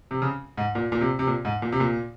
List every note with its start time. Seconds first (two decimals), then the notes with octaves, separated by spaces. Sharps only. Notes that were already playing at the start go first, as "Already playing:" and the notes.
0.11 C3
0.22 C#3
0.58 G#2
0.75 A#2
0.92 A#2
1.01 C3
1.19 C3
1.27 A#2
1.45 G#2
1.62 A#2
1.72 C3
1.80 A#2